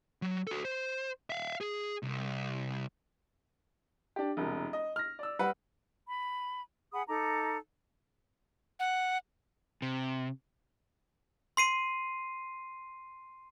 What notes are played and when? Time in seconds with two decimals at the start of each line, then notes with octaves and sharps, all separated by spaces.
0.22 F#3
0.47 F#4 A4
0.65 C5
1.30 E5 F5
1.61 G#4
2.03 C2
4.16 D4 G4
4.37 E1 C2
4.73 D#5
4.96 F6 A#6
5.19 D5 E6
5.39 G3 B4 F#5
6.08 B5
6.93 G#4 F#5 B5 D#6
7.08 D#4 A4 A#5 D6
8.79 F#5
9.82 C3
11.57 C6 C7 D#7